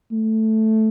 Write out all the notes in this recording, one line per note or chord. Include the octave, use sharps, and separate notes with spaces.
A3